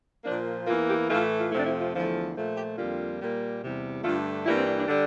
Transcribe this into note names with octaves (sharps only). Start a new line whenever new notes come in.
A#2 F3 A#3 D4
E2 E3 A#3 F4
G4
A2 E3 A3 F4
F4
F2 C3 F3 A3 E4
D4
E4
F4
E2 D3 F3 A3
A#2 F3 A3
G4
F2 D3 G3 A#3 F4
A#2 G3 A#3
E2 C3 G3
G2 D3 A3 F4
G2 E3 G3 A#3 E4
C4
D4
D4
D3 G3 D4